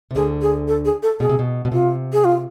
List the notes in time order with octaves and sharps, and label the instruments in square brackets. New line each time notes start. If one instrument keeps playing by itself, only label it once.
[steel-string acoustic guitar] C3
[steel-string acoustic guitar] D2 D3 [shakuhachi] G#4
[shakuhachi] G#4
A4
G#4
A4
[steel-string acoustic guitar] B2 [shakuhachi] G#4
[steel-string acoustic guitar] C3
B2
B2
[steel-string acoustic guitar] C3 [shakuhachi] F4
[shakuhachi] G#4
F4